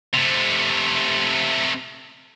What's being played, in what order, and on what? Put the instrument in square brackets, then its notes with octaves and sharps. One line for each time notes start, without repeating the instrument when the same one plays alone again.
[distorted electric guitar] C3 A3